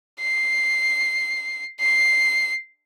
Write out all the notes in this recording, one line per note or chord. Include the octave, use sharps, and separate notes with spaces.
C7
C7